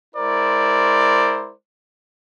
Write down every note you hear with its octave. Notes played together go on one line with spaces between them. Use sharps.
G#3 E4 A#4 C5 D5